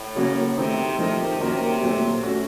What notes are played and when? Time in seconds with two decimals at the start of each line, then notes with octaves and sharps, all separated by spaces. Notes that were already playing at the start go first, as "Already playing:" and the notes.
Already playing: A2
0.15 C#3 F#3 A#3 C#4 F#4
0.57 C3 D#3 A3 C4 D#4
0.98 C3 F3 A3 D#4 A#4
1.40 C3 D#3 A#3 C#4 F#4 A#4
1.81 A#2 F#3 A3 C4
2.23 A3 C#4 F#4